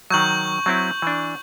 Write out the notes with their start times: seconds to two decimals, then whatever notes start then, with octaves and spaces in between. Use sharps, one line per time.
0.10 D#3 F#3 C#6 G6 F#7
0.66 F#3 C4 E4
1.02 E3 D4